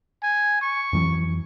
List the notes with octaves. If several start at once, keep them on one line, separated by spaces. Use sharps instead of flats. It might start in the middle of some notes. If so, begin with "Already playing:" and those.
G#5
C#6
F2 E3 F#3